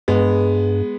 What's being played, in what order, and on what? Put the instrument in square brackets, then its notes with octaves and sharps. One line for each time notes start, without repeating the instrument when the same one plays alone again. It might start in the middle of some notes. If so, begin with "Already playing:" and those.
[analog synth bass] G2 [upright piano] G#3 B3